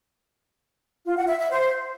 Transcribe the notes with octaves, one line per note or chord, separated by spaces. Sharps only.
F4
F#5
E5
E5
C5